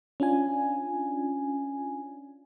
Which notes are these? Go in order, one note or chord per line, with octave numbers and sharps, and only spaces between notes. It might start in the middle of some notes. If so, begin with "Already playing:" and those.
C#4 D4 F4 G#5